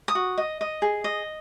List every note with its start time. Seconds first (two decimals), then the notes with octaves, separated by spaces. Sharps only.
0.08 D#6
0.15 F#4
0.38 D#5
0.61 D#5
0.82 G#4
1.04 D#5